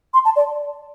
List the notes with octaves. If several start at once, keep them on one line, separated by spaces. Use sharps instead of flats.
C6
A5
D5